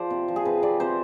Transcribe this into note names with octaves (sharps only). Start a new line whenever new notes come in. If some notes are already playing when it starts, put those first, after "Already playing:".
Already playing: F3 C5 D5
C3
F3
G#4
C3 B4
C3 D5
C3 C5